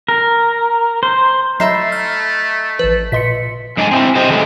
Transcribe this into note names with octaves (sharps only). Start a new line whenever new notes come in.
A#4
C5
F#3 A3 D#4 E5 B5 C7
F6
A1 F3 B4
A#2 D#5 C6 B6 C#7
G#2 G#3 D4 D#4 D#5 G#5
C4 D#4 E4
G4 C5 D#5
D#3 E3 G#3 A3 B3 D4